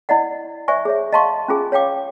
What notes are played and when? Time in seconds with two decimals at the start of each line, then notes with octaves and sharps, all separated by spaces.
0.09 E4 D5 D#5 F#5
0.68 C5 D5 E5 G#5 C#6
0.85 G#4 C#5 E5
1.12 D#5 F5 A5 C6 C#6
1.48 C#4 F4 G#4 G#5
1.72 C#5 F5 G5 D6